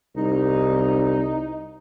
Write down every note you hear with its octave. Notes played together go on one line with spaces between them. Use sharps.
C2 D#4